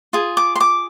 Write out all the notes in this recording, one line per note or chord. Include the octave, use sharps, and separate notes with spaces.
F4 G#4
D6
C6
D6